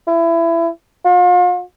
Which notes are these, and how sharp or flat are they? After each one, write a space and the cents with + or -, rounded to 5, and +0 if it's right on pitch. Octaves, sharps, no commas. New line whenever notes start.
E4 +25
F4 +40